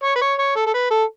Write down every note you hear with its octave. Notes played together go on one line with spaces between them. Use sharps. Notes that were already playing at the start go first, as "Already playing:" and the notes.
C#5
B4
C#5
C#5
A4
A4
B4
A4